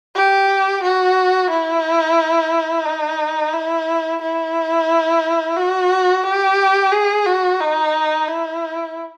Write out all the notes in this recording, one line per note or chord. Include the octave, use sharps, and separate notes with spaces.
G4
F#4
E4
D#4
E4
E4
F#4
G4
G#4
F#4
D#4
E4